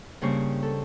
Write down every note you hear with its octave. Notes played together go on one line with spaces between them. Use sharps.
G2 C#3 A#3 C5 C#6
A4